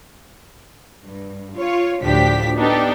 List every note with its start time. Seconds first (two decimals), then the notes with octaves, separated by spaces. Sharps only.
1.05 G2
1.59 F4 C#5
2.04 D2 A2 F3 D4 G4 B6
2.57 B3 D4 D#4 G4 A4